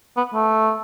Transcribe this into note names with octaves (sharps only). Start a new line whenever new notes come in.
B3
A3